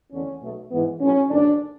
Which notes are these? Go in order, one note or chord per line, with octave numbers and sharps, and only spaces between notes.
E2 D3 A3 C#4
B1 B2 A3
G#2 E3 B3
B1 A2 F#3 C#4
F#1 E2 D3 D4